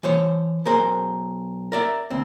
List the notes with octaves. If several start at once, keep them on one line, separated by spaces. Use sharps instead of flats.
E3 C5 C#5
B1 G#4 A#4 C5
A#4 D5 E5
D2 C4